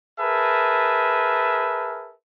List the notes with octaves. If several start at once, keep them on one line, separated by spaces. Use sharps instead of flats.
G#4 A#4 B4 E5 A5